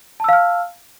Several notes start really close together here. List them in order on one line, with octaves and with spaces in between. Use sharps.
A5 E6 F5 F6